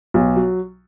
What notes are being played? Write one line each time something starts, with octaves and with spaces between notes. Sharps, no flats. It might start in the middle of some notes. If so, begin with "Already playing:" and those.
B1
F#3